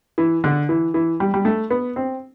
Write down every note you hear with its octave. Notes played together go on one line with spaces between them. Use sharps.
E3
D3
E3
E3
G3
G3
A3
B3
C4